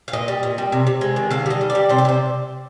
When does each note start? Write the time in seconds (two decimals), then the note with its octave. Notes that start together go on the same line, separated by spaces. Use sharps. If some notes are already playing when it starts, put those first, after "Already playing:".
0.08 F5
0.13 A#2 D#5
0.28 G3
0.43 A#2
0.58 G3
0.72 C3
0.87 C3
1.01 G#3
1.16 D#3
1.30 D3 F5
1.46 G3 D#5
1.61 D3
1.70 D5
1.75 G3
1.89 C3 C5
1.98 D5
2.05 C3 C5